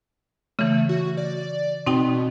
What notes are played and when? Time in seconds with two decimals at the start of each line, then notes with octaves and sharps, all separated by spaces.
0.59 C#3 E3 A3
0.89 F#4
1.17 D5
1.86 B2 C4 D#4 G5